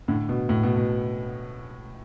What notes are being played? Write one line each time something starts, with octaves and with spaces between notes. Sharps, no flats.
A2 D3
B2
A2
B2
B2